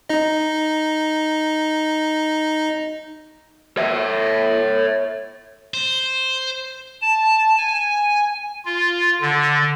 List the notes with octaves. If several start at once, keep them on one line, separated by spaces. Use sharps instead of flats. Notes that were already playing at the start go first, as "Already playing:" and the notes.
D#4 D#5
C#5 E5
C5
A5
G#5
F4
D3